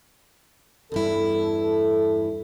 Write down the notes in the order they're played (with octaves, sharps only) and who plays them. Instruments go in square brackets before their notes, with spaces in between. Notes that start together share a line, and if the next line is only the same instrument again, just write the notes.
[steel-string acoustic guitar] E2 G2 E4 [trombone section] A4